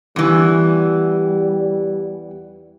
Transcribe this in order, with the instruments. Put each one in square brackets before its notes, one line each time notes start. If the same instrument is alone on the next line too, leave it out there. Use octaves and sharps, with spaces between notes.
[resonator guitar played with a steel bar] E2 E3 [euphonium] G3